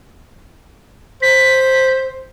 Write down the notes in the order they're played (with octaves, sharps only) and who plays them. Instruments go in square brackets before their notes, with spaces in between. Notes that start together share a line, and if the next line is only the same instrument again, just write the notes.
[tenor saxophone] C5 [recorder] B6